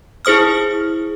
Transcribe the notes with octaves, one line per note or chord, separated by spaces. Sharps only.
E4 G#4 C5 D#6 F6